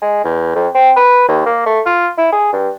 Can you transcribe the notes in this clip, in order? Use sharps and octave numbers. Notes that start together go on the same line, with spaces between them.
G#3
E2
F2
C4
B4
D#2
A#3
A3
F4
E4
G#4
G2